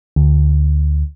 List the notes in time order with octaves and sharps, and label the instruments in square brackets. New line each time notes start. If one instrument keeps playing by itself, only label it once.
[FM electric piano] D2